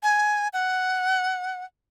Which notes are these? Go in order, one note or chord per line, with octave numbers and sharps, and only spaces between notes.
G#5
F#5